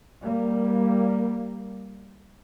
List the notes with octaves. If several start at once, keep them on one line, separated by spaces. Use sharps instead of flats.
G3 A#3